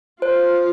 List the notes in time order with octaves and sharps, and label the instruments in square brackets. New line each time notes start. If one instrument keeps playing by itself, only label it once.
[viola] F4 [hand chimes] C5